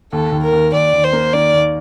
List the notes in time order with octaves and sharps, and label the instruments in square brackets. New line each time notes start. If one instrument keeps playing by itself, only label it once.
[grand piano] D#2 [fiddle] A4
[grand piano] D#2
[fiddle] A#4
[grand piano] D#2
[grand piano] D#2 [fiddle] D5
[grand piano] D#2
[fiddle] C5
[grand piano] A#3
[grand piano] D#3 [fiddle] D5
[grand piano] D#2